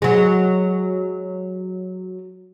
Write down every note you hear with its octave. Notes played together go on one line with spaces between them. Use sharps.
F#3 G#3